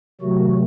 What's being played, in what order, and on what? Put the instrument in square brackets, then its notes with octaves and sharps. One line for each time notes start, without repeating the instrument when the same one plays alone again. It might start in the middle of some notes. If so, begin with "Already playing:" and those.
[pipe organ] C3 D#3 F#3 A3 F#4